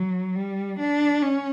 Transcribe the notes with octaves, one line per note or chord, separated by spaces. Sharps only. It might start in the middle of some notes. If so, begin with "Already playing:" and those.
Already playing: F#3
G3
D4
C#4